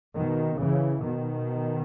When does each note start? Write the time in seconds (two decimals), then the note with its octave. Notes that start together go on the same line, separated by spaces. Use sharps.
0.15 B2 D#3
0.59 C#3 E3
1.01 B2 D#3